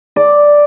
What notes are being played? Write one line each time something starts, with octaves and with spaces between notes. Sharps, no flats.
D5